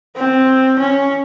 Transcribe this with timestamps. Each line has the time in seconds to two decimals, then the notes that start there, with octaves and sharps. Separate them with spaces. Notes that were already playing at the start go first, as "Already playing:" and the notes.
0.17 C4
0.79 C#4